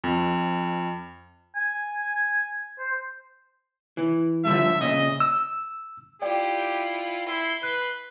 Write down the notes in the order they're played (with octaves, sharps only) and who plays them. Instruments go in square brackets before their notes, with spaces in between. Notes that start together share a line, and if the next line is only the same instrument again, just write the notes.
[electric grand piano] F2
[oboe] G#5
C5
[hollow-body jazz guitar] E3
[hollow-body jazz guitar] G2 D3 F3 [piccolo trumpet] E5
[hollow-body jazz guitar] A#2 C#3 [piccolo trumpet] D#5
[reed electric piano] E6
[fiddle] E4 F4 [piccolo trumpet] G4 [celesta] D5 G5
[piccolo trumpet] E4 [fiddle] C6
[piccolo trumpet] B4 [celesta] F#6